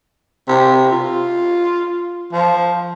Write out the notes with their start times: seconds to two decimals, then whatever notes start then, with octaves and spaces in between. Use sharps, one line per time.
0.48 C3
0.92 F4
2.33 F3